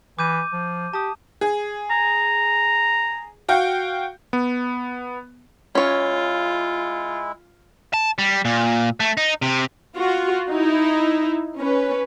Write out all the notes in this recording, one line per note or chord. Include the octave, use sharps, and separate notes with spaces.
E3 D6 G6 D#7
F3
G4 A5 D#6
G#4
A#5
F#4 F5 G5
B3
G#3 C#4 E4 F4 C#5
A5
G3
A#2
A3
D#4
C3
F4 F#4
D#4 E4
C#4 B4